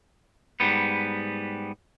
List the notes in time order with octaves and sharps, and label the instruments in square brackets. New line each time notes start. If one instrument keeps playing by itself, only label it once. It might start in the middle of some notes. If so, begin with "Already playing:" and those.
[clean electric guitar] G#2 G3 B3